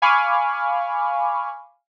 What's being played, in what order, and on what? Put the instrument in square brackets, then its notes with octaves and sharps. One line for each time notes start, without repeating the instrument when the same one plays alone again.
[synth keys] F5 G#5 B5 C#6 D6 F6